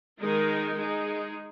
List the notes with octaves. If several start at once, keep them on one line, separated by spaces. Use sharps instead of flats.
D#3 G#3 D#4 A#4
G#3 D#4 G#4